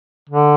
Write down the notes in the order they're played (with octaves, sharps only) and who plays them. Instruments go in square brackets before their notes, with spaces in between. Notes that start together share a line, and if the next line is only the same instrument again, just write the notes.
[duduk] D3